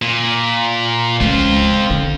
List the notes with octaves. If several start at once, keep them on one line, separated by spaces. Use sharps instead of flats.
A#2
C#2 C4 F4
D3